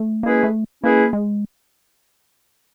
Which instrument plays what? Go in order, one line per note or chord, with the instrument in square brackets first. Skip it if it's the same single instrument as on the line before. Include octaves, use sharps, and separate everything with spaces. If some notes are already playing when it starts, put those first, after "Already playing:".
Already playing: [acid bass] A3
[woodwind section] G#3 C#4 E4 G#4 B4 [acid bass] A#3
[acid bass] A3
[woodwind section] G#3 C#4 E4 G#4 B4 [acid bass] A#3
[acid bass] G#3